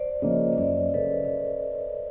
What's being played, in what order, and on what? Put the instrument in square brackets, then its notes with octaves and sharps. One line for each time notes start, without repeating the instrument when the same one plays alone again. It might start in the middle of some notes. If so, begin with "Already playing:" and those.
Already playing: [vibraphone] C5 D5
D5
[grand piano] C#3 F3 A#3 C#4 [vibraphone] C#5 D#5
[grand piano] F#2 [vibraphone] D5 E5
[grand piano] C#3 [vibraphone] A4 B4